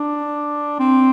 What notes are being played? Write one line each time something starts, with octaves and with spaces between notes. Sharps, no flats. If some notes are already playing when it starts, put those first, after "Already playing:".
Already playing: D4
C4